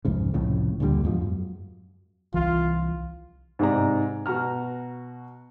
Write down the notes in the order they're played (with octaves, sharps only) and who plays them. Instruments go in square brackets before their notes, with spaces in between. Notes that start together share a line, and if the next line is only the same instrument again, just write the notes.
[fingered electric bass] C2 F2 G#2 C#3
C2 F2 A2 C#3
D2 A#2 D3 G3
E2 G#2 F3
F#2
[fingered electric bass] C2 E3 [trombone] F4
[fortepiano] G#2 C3 D#4 D5 A#5
B2 F#4 A#5 F6